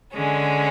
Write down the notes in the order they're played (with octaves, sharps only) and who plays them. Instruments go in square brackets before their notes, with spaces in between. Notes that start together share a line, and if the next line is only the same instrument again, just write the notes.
[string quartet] D3 G#3 C#4